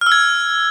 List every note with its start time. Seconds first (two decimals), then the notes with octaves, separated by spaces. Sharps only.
0.01 F6
0.06 E6
0.12 G#6